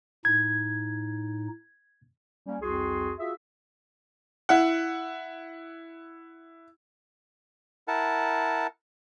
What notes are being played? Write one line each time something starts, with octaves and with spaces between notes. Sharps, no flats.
A2 D#4 G#6
G3 A#3 C#4
C2 F2 F#4 G#4 C6
F4 F#4 G#4 E5
E4 F#5
E4 A#4 F#5 A5